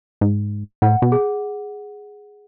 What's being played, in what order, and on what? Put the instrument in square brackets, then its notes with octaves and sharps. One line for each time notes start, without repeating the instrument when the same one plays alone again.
[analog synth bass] G#2
[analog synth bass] A2 [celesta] F#5
[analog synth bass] B2
[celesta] G#4